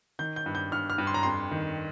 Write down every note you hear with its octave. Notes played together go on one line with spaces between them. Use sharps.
D#3 G6
G6
G2
G6
G2 F6
F6
G2
C6
A#5
F2 C6
D#3